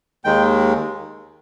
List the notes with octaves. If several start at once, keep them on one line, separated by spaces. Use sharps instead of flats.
D#2 D#3 G#3 G5